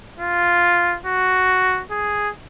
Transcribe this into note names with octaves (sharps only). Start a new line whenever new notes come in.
F4
F#4
G#4